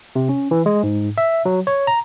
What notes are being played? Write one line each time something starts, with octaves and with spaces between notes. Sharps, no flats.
C3
C#4
E3
G#3
G#2
E5
F#3
C#5
A#5